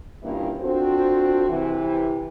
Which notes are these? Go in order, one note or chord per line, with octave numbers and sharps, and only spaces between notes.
G2 A#2 E3 A#3 C#4 E4
C4 D4 F4 F#4 A4 C5
C3 E3